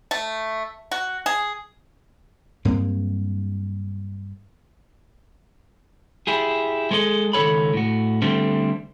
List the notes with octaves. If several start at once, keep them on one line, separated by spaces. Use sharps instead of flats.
A3
F#4
G#4
G2 F#3 A#3 C4
E4 G4 G#4
G#3 G#4 A4 C#5 D#5
C#2 D#3 A4 C#5 B5
A2 F#4
D3 G3 A3 C4